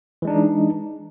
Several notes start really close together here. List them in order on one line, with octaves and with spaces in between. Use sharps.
E3 G#3 D4 D#4